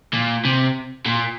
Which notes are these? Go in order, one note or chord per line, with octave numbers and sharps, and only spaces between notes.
A#2
C3
A#2